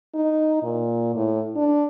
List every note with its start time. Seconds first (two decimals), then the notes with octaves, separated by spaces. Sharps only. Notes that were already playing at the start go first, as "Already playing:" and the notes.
0.15 D#4
0.63 A#2
1.15 A2
1.56 D4